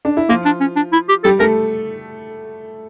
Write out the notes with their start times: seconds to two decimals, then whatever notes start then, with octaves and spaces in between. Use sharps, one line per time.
0.05 D4
0.17 E4
0.29 F3 A#3 F4
0.45 D4
0.61 C#4
0.76 D4
0.93 E4
1.09 G4
1.24 G3 G4 A4
1.40 A3 A4 A#4